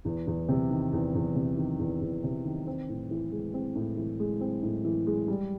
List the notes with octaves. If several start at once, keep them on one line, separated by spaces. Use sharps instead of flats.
E2
E2
C3
D#3
E2
E2
C3
D#3
E2
E2
C3
D#3
C4
A2
E3
G#3
C4
A2
E3
G#3
C4
A2
E3
G#3
G3